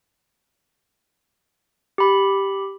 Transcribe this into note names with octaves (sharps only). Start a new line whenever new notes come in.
G4 B5